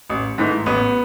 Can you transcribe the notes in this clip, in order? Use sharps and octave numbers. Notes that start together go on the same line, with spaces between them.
A1
G#2 E3 A3
A1 B3